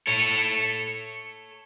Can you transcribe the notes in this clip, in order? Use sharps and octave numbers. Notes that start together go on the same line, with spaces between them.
A4 C#5